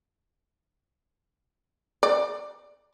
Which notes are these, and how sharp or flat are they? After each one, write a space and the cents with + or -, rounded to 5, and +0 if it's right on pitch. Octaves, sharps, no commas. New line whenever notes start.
D5 +15